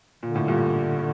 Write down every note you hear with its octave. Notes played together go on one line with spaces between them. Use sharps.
A#2 D3
A2
G2 A#2